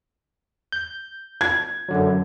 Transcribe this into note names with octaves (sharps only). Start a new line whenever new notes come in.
G6
G#6
F#2 D3 F#3